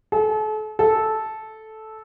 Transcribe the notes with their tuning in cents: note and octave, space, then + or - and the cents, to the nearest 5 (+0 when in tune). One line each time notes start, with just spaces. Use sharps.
A4 -40
A4 -10